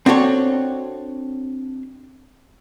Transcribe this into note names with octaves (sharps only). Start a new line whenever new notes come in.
C4 D4 F#4 A4 C#5